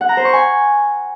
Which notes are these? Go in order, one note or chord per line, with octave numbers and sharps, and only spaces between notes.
F#5
A#5
C5
C#6
G#5